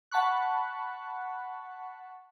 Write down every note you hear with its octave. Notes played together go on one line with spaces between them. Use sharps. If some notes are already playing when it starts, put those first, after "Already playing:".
F#5 A5 B5 C#6 F#6